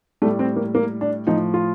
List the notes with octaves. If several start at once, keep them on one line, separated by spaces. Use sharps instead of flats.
A2 G3 A3
C4
A#3
A#3
D4
A2 F3 D#4
F4